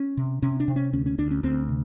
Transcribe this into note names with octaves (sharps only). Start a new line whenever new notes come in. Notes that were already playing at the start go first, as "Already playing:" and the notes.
Already playing: C#4
C3
C3 C#4
D4
C3
C#4
D2 C#4
C#4
D2 D4
C#4
D2 C4
C3